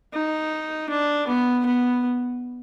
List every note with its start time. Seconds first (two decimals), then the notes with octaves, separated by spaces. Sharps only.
0.13 D#4
0.89 D4
1.27 B3
1.66 B3